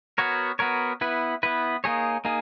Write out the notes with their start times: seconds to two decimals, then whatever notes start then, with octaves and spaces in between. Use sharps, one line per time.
0.18 B3 F#4 A#4 C#5
0.59 B3 F#4 A#4 C#5
1.01 B3 E4 B4
1.43 B3 E4 B4
1.84 A#3 D#4 G#4 C#5
2.25 A#3 D#4 G#4